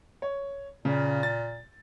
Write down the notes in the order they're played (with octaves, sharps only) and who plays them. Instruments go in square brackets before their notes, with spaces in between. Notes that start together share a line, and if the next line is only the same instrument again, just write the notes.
[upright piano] C#5
[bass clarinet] A#2 [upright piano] C#3
[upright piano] A6